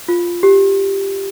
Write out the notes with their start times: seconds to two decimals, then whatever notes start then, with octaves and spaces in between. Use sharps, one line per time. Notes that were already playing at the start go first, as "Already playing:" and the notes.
0.08 F4
0.43 G4